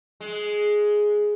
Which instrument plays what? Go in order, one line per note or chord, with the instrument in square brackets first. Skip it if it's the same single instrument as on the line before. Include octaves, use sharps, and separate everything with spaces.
[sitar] G#3